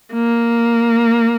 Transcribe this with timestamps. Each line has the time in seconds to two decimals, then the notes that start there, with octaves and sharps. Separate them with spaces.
0.14 A#3